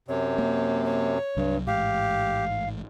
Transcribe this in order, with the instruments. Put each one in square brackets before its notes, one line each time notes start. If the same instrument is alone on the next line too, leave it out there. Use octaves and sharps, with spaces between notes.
[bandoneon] F#2 C3 [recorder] C#5
[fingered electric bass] A#3
[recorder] C#5
[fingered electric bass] C2 F#3 [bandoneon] G2
[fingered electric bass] A1 G#2 [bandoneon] G4 [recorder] F5